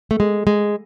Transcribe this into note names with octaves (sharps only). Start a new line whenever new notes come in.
A3
G#3
G#3